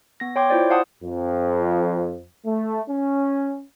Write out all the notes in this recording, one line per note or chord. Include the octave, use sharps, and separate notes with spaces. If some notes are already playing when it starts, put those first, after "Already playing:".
B3 A#6
C#5 G5 C6 D6 G#6
E4 F4 C5 D5
C5 F5 F#5 A5 D#6
F2
A3
C#4